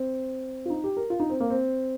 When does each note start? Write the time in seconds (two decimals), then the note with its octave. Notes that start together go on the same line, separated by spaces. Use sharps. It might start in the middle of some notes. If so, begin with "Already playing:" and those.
Already playing: C4
0.66 F4
0.70 D#4
0.84 G4
0.97 A#4
1.10 F4
1.20 D#4
1.30 C4
1.40 A#3
1.50 C4